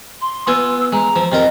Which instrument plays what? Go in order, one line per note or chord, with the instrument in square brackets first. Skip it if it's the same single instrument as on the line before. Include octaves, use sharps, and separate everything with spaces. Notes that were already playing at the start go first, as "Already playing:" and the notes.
[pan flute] C6
[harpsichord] B3 F4 G#5 [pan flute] E6
[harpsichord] G#3 [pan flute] A#5
[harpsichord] F3
[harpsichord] C3 F4 A#4 [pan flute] D#5